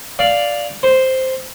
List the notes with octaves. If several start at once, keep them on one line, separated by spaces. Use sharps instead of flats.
D5 F5
C5